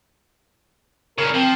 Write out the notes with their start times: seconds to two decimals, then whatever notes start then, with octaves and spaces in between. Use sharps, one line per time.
1.18 G2 C#3 A#4
1.34 F3 C4